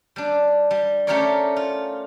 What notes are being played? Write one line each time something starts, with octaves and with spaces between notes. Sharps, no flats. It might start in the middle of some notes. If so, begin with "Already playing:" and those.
G3 D4
G3
A3 C#4 G4 A#4 C#5 D5
F4